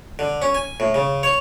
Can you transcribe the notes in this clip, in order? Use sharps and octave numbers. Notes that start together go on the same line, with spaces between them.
D3
C#4
G#5
A2
C#3
C#5